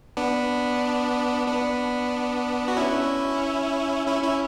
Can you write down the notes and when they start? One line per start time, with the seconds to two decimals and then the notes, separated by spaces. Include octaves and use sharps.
0.17 B3 D4
1.47 B3 D4
2.68 F#4
2.77 C#4 E4
4.07 C#4 E4
4.23 C#4 E4